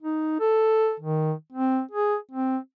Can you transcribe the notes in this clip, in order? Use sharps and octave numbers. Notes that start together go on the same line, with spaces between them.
D#4
A4
D#3
C4
G#4
C4